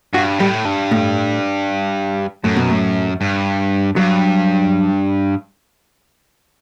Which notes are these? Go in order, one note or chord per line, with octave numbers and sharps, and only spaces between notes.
G2 F#4
A2 G3
G2
A2
F#2 A2
B2
A2
G2
G2 F#3